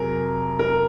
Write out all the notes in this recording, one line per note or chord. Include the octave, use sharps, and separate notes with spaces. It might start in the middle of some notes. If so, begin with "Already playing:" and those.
Already playing: F2 C3 F#3 G#4 A#4
A#4